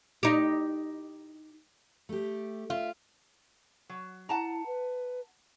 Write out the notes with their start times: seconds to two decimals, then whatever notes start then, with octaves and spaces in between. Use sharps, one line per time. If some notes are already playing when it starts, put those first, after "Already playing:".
0.23 D#4 G4
2.09 A3 G4
2.70 F4 E5
3.89 F#3
4.29 E4 F#5 A5 A#5
4.66 B4